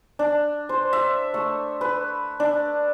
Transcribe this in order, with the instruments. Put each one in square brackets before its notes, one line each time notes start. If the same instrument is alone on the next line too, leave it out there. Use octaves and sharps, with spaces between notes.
[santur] D4
C5
E5
A3
B4
D4